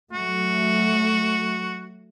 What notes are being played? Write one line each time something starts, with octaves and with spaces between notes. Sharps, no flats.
F#3 A3 F#4